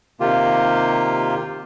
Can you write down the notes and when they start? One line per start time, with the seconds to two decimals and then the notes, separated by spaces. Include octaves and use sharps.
0.20 C3 D#3 A#3 F4 G4